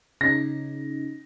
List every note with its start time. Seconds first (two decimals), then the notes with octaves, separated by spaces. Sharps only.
0.21 C#3 D#4 A#6